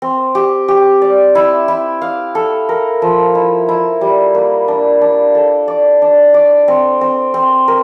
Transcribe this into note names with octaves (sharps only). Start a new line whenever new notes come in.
C4
G4
G4
D5
E4
E4
F5
A4
A#4
F3
E4
E4
G3
A#3
D4
D4
A4
D5
D4
D5
C4
C4
C4
A#4